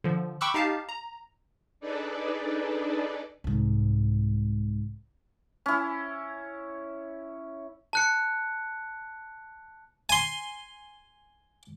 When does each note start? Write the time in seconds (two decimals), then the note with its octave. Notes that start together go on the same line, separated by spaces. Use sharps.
0.04 D3 F3
0.41 G5 B5 C#6 D6 E6 F#6
0.54 D#4 G4 F5 A5
0.89 A#5
1.80 D4 D#4 G#4 A4 B4 D5
3.44 C2 G#2
5.66 C#4 E4
7.93 A5 F#6 C#7
10.09 G#5 C6